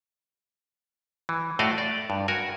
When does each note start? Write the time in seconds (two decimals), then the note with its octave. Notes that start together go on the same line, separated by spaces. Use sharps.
1.29 E3
1.59 A2 A3 F#4 D5 D#5 F5
1.78 D5
2.10 G2
2.28 F#4 A#4 G#5